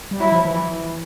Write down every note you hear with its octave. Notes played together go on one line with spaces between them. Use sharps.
G3
F#3 E4
F3
E3